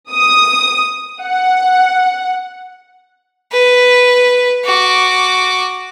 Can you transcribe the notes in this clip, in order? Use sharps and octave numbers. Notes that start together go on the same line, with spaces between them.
D#6
F#5
B4
F#4 D6